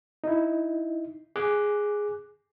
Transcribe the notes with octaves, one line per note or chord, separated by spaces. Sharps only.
D#4 E4
G#4 D6 F#6